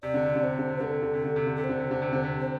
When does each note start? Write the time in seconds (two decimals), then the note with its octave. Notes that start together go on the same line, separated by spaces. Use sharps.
0.03 C3 D5
0.14 D3
0.25 C3
0.36 D3
0.44 C3 C5
0.59 D3
0.69 C3
0.80 D3 A4
0.91 C3
1.03 D3
1.14 C3
1.25 D3
1.36 C3
1.47 D3
1.56 C3 A4
1.64 C5
1.69 D3
1.80 C3
1.91 D3
2.02 C3
2.13 D3
2.24 C3
2.39 C5